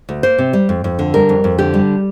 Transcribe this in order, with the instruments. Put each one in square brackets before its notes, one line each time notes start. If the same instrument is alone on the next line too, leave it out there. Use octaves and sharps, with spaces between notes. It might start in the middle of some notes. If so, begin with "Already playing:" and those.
[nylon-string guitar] D2
A#3 C5
C3
G3
F2
F2
D3
G3 A#4
F2
F2
D3 G4
G3